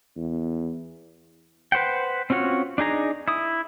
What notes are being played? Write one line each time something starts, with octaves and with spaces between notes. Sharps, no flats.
E2
B4 C5 F#5 G5
C4 C#4 F4 F#4 C#5
D4 D#4 G#4 A#5
E4 D#6